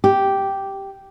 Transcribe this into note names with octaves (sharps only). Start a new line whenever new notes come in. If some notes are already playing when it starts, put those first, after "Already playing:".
G4